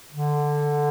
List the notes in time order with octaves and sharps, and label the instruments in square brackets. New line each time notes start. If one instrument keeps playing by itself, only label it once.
[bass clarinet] D3